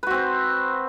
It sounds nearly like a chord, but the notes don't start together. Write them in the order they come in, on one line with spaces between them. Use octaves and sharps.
B4 F#4 C4 C5